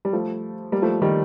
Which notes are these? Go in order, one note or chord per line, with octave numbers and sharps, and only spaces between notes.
G3
F3 A3
G3 A#3
F3 A3
D#3 G3